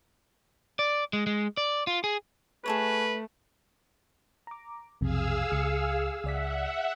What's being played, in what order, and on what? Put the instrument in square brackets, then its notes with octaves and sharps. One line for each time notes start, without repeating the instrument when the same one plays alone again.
[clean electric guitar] D5
G#3
G#3
D5
F4
G#4
[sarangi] A3 [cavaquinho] G#4 A4 C#5 [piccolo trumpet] B4
[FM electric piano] A#5 D6
[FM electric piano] B1 F2 C3 [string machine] G#4 F5 E6
[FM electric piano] C#2 C#7
[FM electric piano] C#2 D5 B6 [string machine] E5 F#5